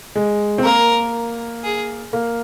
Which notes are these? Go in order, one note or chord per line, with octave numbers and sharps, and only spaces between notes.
G#3
C4
A#3 A#4
G#4
A#3